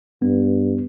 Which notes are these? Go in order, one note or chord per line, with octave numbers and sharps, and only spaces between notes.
G2 B3